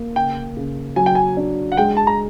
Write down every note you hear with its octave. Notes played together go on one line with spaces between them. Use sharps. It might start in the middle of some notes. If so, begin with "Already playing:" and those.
Already playing: A#3
C#3 G5
C#3
F#3 G#5
G5
G#5
D4
F#5
G#3 G5
A5
A#5